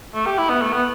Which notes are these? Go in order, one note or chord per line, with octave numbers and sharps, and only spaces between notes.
A3
G4
E4
B3
A3
B3